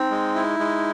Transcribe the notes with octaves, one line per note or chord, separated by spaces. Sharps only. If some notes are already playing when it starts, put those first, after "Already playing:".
Already playing: C4 D#4
G#3
E4
G#3